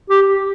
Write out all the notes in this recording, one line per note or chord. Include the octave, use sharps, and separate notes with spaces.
G4